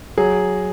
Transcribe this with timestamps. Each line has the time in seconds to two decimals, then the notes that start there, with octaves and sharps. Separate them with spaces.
0.18 F#3 G#4